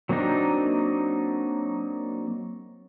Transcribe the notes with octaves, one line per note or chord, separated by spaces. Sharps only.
F#3 A#3 C4 D4 D#4